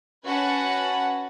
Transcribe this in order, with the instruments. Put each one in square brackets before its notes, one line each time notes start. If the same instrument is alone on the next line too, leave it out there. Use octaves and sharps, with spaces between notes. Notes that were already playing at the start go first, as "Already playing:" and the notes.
[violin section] C#4 F#4 B4 F#5 A5